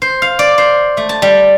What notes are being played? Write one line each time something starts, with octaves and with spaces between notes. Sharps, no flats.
C5
F5
D5
C5
A3
A5
G3